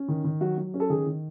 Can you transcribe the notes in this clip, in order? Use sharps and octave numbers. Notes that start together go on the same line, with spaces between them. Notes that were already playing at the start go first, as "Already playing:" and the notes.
Already playing: C#4
D#3
D#3
F#3 F#4
F#3
C#4
A4
D#3 G#4
D#3